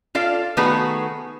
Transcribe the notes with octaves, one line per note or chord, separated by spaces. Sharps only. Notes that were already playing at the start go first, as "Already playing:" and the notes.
F4 A4 D5 F5
D#3 A3 B3 F#4 G#4 B4